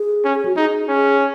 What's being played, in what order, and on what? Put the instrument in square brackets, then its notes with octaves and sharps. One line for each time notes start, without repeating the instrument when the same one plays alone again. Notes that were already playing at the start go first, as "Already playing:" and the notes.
Already playing: [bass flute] G#4
[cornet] C#4
[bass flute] G#4
F#4
[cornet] D#4 [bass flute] G#4
[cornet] C#4 [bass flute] G#4